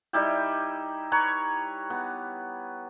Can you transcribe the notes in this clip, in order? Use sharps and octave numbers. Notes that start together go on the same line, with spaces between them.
G3 D#4 E4 G4
B4 C#5 A#5
B3